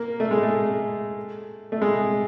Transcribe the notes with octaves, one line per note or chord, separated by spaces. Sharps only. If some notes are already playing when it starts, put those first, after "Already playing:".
Already playing: A#3
A3
G#3
A3
A3
G#3